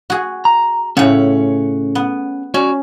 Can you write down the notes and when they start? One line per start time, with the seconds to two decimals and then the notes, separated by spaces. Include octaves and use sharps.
0.10 F#4 G#4
0.45 A#5
0.97 A2 C#3 C#4 C#5 F#5
1.95 B3
2.54 C#4 F#4 C#5 D5